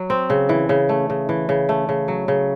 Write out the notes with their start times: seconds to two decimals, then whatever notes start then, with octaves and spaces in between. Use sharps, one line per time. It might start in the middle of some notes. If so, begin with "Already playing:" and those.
Already playing: F#3
0.10 C4
0.30 C#3
0.49 E3
0.69 C#3
0.89 A3
1.10 C#3
1.29 E3
1.49 C#3
1.69 A3
1.89 C#3
2.08 F#3
2.28 C#3